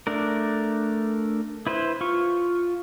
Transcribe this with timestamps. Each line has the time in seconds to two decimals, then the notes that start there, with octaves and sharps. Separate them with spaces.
0.07 A3 D4 A#4
1.67 E4 B4 C5
2.01 F4 C#6